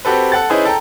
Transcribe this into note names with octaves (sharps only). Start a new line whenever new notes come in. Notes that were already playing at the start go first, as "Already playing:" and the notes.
C4 F#4 G4 A4 B4
A4 F#5 A6
C#4 D#4 E4 G#4 B4 C5
A4 G5 A#5